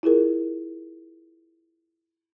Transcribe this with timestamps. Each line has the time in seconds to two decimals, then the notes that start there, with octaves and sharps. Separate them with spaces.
0.03 E4 F4 G#4 A#4